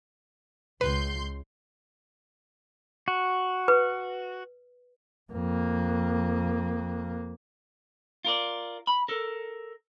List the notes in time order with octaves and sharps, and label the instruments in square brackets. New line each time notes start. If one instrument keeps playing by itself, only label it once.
[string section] C#2 C6 G6 [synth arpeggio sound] B4
[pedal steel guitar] F#4
[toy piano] B4
[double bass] F2 A#3
[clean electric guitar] F4 A#4 D5
B5
A4 A#4